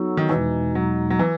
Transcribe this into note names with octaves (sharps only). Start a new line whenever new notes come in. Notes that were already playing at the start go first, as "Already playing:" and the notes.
Already playing: F#3 B3 D#4 F#4 A4
D#3
E2 B2 E3 G#3 D#4
F#3
F#3
E3